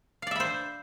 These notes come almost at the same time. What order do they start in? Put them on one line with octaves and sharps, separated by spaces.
F5 D5 E5 B5 C5